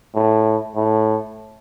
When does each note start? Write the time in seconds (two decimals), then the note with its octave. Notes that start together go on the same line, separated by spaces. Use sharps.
0.15 A2
0.76 A2